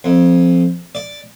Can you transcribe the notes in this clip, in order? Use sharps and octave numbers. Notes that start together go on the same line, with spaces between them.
F2
D5